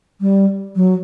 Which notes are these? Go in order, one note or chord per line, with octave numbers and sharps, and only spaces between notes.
G3
F#3